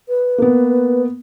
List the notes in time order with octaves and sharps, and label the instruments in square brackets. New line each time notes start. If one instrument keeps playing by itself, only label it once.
[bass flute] B4
[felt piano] A#3 B3